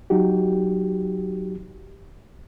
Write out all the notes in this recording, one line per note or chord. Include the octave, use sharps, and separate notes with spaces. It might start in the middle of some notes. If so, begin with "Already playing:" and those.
F#3 D#4 F#4 G4